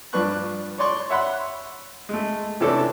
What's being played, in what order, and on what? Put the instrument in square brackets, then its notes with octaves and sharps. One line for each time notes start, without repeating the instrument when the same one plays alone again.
[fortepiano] G2 F3 D4 B4 C#6 F#6
C#5 D5 C6 C#6
C#5 E5 F#5 B5 C6
G#3 A3
C3 E3 C#4 D4 E4 A4